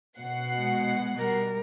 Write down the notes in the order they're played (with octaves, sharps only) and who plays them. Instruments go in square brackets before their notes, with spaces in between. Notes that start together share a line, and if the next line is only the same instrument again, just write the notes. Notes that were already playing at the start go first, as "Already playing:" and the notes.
[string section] B2 F#5 C7
[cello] G#3
G3 A#4